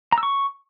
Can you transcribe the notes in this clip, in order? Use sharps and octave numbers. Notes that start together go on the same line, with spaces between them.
A#5
E6
C#6